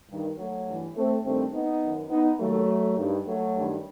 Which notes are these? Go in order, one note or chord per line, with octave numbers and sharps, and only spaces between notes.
G2 D#3
F#3 A3
G2 E3
A3 C4
G2 D#3 A3 C4
B3 D#4
F#2 D#3
B3 D#4
D#2 D#3 F#3 A3
G2 D#3
F#3 A3
G2 D#3